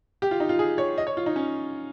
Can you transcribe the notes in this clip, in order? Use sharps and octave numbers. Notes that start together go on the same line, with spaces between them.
G4
F4
D#4
F4
G#4
C#5
D#5
C#5
F4
D#4
C#4